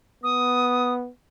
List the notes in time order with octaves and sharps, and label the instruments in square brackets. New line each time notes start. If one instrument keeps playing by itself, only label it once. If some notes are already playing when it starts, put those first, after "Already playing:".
[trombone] B3 [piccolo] D#6